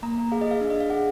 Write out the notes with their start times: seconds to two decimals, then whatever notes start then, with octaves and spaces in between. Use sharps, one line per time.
0.03 A#3 A#5
0.18 A#3
0.32 G#4 F5
0.41 D#5
0.47 G#4 F5
0.61 D4 F5
0.70 D#5
0.76 D4 F5
0.90 G#4 F#5